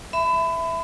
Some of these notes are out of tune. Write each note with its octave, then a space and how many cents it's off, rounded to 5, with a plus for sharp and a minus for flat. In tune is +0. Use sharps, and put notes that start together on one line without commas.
E5 +0 B5 +30